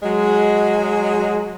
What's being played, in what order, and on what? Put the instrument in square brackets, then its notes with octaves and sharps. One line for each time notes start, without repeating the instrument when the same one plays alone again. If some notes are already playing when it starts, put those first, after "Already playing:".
[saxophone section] F#3 G#3